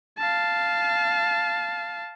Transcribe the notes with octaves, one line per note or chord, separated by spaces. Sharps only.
F5 A5